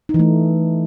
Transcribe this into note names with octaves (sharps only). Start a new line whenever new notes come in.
D#4
E3
A3